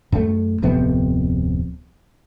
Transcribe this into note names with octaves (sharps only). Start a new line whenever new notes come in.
F#2 A3
D1 F2 C3 B3